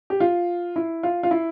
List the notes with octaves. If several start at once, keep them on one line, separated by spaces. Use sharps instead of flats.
G4
F4
E4
F4
F4
E4